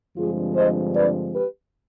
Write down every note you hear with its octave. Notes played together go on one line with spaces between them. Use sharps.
G2 D3 F3 G#3 C4 F4 G#4
C5 D#5
B4 D5
G4 B4